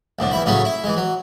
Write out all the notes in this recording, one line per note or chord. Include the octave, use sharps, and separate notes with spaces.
C2 A2 D3
E2 E4 B5
A2 C#3 F#3 A3 C#4
E4
E3 G#3
F#3